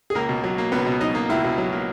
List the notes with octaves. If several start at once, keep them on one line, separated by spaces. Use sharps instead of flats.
G#4
C#2 A#3 A#4
B2
F#3
A#3
C#2 B3 B4
B2
F#3 D#4 D#5
A#3
C#2 E4 E5
B2
F#3
A#3